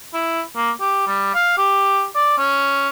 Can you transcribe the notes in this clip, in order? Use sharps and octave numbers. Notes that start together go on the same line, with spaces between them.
E4
A#3
G4
G3
F5
G4
D5
C#4